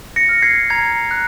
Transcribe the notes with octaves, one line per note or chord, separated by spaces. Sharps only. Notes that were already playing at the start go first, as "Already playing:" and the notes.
A#6 C#7
F6
G#6 C7
A#5 G#6
F#6